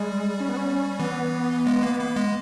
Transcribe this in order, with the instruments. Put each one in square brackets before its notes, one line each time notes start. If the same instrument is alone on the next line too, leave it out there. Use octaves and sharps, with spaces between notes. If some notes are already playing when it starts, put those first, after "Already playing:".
Already playing: [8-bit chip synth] G3 [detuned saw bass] G#3
[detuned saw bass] C#4
B3
C#4
C#4
[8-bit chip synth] E3 [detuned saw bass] B3
[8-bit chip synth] G#3
A#3
A#3
G#3